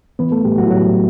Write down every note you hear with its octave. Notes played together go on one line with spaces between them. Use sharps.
E3 B3 B4
A3 A4
A2 G3 G4
F#3 F#4
E4
A2 F#3 F#4